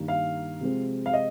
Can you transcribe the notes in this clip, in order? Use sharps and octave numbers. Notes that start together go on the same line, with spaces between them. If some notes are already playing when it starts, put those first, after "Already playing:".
Already playing: G2 D#3 G3 A#3
F5
C3 F3 G#3 C4
F5
D#5